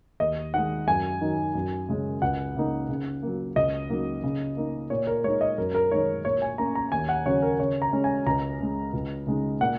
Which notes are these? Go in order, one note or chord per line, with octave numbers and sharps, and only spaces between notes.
D#2 D#5
D#3 G#3 F#5
F#2 G#5
D#3 F#3 D#4
F#2
C#3 G#3 C#4
C#2 F#5
C#3 A#3 D#4
C#3
F#3 A#3
C#2 D#5
C#3 F#3 A#3 D#4
C#3
A#3 D#4
A#2 C#5
A#4
G#3 D#4 C#5
D#5
F#2 A#4
A#4
D#3 G#3 D#4 C#5
A#2 C#5
G#5
A#3 C#4 A#5
A#5
D#2 G#5
F#5
C#3 F#3 C#4 C#5
A#4
C#3 C#5
A#5
G#3 C#4
G#5
C#2 A#5
C#3 G#3
C#2
C#3 G#3 D#4
A#2 F#5